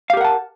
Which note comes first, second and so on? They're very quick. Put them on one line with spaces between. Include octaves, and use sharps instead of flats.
F5 G4 A#4 F#5 A5